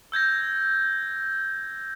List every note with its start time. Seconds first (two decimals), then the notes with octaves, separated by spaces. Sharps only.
0.12 E6 G6 G#6 A#6